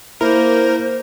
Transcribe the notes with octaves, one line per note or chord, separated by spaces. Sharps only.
A#3 E4 A#4 C5